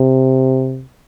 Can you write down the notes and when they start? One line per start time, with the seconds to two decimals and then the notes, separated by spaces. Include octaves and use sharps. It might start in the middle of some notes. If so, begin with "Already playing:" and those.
Already playing: C3